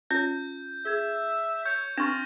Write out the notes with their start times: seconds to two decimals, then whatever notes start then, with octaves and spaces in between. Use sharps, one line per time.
0.11 C#4 F4 G6
0.85 G#4 E5 G#6
1.66 C#5 G6
1.98 C4 D4 F4 C6 C#6 F6 A#6